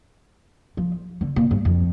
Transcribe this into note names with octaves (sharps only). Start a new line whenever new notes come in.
F3
D3
A#2
G2
F2